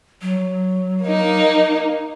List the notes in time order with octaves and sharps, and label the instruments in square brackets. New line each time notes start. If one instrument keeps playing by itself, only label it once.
[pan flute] F#3
[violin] A#3 D#4